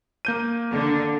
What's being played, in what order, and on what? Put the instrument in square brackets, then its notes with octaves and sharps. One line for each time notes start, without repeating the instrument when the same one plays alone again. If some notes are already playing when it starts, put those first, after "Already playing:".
[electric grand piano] A#3 G6 D#7
[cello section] D3